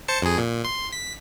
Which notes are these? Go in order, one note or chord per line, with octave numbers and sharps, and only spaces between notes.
C5 A5 C#7
F2 G#4
A#2
C6
B6